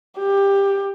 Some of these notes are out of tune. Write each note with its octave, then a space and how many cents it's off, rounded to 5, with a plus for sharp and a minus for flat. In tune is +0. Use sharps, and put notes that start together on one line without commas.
G4 +15